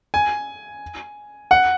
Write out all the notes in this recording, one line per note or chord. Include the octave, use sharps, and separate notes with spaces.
G#5
F#5